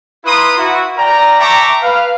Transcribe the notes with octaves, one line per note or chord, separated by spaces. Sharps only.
E4 F4 B4 A#5 C6 D#6
E4 F#4
A#4 D5 G5 A#5
E5 G5 A5 A#5 C#6 D6
B4 F5